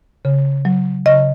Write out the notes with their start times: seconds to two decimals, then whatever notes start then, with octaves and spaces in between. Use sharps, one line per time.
0.25 C#3
0.65 F#3
1.05 C#3 D#5